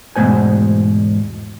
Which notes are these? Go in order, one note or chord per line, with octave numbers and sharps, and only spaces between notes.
E2 G#2 B2 A3 C5 G#5